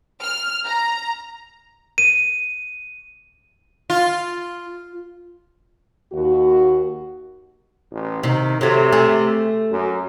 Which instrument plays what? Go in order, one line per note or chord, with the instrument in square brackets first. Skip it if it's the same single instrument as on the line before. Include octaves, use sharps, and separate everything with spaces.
[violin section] F6
A#5
[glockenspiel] D#7
[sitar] F4
[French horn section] D#2 F#4
[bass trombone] A1
[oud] C3 [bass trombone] D#3
[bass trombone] C3 [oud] F#3 A3
[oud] A3 G#4
[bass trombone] F#2